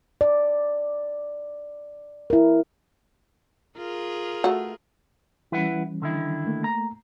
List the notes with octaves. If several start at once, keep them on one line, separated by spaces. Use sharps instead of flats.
D5
E4 A#4
F4 G#4 A#4
A3 F#4
E3 G3 C#4 E4 B4 F#5
D3 D#3 E4
A3 A#3
A#5